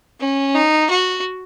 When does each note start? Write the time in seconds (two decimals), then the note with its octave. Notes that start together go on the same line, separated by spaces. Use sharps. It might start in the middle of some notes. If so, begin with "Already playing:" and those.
0.20 C#4
0.55 D#4
0.90 F#4